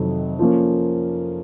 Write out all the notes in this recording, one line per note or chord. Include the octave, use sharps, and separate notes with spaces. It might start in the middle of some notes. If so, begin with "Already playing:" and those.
Already playing: F2 C3 D#3 F#3
F3 A#3 C#4